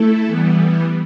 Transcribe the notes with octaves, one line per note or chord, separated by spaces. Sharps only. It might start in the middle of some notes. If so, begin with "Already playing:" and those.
Already playing: A3 E4 A4
E3 G3 B3